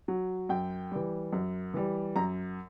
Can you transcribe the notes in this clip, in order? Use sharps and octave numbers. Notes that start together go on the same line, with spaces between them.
F#3
F#2 G5
E3 G3
F#2
E3 G3
F#2 A#5